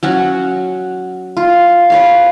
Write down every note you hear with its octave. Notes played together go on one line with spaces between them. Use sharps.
F#3 C#4 F#4
F4
B4 C#5 F5